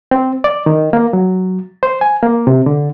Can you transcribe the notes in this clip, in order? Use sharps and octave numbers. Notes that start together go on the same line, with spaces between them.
C4
D5
D#3
A#3
F#3
C5
G#5
A#3
C3
D3